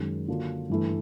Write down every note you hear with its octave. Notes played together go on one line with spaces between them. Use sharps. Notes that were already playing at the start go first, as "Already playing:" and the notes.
Already playing: F#2 D#3 G#3
D3 F#3 A#3 D4 F4
G2 E3 A3